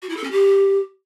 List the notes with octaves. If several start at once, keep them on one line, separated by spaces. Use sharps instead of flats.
F#4
E4
A4
C#4
G4